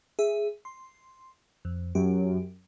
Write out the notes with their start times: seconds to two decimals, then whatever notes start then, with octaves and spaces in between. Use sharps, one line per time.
0.19 G#4 E5
0.65 C6
1.65 F2
1.95 F#2 G4